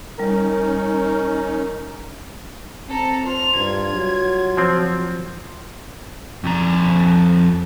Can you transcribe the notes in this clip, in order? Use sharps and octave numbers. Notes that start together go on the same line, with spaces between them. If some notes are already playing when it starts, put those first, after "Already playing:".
G3 C#4 D#4 A#4
C4 A4 A#5
F4 C5 F7
G2 G#6
F#3
F3 C4
F2 A#5